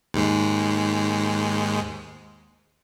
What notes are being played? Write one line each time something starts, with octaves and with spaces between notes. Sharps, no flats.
D#2 G#2 G#3